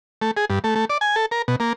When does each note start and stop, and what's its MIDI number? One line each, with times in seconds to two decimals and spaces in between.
0.22 0.31 57
0.37 0.45 68
0.50 0.59 43
0.64 0.75 57
0.76 0.85 57
0.90 0.98 74
1.01 1.16 80
1.16 1.26 69
1.31 1.42 70
1.48 1.56 47
1.60 1.73 58